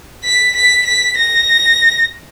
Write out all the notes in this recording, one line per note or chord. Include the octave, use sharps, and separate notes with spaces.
B6
B6
B6
A#6